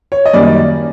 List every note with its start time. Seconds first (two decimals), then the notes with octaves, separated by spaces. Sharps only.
0.12 C#5
0.26 D#5
0.33 F#2 D#3 G3 A#3 C#4 D5